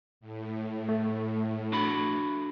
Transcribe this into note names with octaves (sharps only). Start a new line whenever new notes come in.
A2
A3
D4 F#4 B5